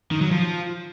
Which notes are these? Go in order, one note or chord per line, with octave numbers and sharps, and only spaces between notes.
D#3
F#3
F3